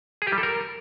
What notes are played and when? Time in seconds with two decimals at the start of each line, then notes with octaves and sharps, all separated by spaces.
0.22 G#4
0.27 G4
0.32 G3
0.38 A4
0.43 A#4